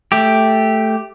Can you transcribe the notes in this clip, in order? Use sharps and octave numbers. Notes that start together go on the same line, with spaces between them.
A3 G4